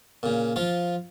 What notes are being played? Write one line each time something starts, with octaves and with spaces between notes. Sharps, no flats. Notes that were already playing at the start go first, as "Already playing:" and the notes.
A#2 C#3
F3 F4